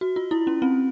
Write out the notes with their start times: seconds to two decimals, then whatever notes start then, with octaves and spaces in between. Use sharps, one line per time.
0.01 F#4
0.16 F4
0.31 E4
0.47 C#4
0.62 C4